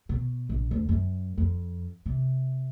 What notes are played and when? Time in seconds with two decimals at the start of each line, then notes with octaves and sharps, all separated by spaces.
0.09 B2
0.49 A#1
0.71 D2
0.89 F#2
1.38 F2
2.06 C3